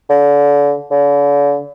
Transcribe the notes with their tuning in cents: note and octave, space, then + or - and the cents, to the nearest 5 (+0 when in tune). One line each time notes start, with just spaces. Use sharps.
D3 -30
D3 -45